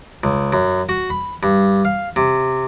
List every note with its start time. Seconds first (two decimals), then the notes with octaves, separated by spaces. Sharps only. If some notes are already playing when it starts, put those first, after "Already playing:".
0.24 C#2
0.53 F#2
0.89 F#4
1.10 B5
1.43 G2
1.85 F5
2.16 C3